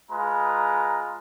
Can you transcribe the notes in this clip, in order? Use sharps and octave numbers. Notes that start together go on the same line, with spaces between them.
G#3 F4 B4 A#5